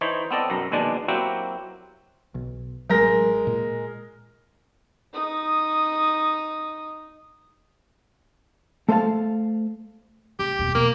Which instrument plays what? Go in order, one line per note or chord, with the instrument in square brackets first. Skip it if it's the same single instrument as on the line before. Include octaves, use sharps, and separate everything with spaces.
[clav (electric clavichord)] E3 D#4 C5 C#5
B3 C4 A4 D5 D#5
B1 F#2 A#5
A#1 D#2 B2 G#3 D4 D5
F#3 A#3 C4 E4 F#4 G4
[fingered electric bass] B1
[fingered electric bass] A1 F#3 [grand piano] G#3 A#4 A#6
[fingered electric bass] A#2
[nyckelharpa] D#4 D#6
[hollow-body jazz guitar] A3 A4 C5 D5 F5 A5
[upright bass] F1 [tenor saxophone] G4
[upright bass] E2 B2
[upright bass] F2 B2 [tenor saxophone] A#3